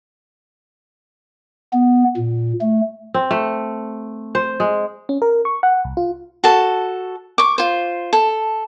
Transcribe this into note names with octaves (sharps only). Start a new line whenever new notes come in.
B3
A#2
A3
C4
A3
C5
G#3
C#4
A#4
C#6
F#5
C2
F4
F#4 A4 A5
C#6 D6
F4 C5
A4